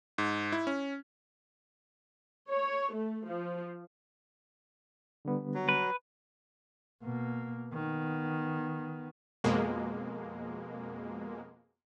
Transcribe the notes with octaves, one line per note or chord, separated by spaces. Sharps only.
G#2
E4
C#4
C#5
A3
F3
D3 G3 B3
F#3
B4
B2 A#3
D#3 B3
F2 B2 G#3 A#3